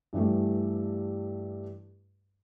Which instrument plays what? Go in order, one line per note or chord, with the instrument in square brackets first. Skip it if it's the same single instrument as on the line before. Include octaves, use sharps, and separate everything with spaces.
[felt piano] G2 E3 G3 A3